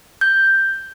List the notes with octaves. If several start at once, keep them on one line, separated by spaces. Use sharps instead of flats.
G6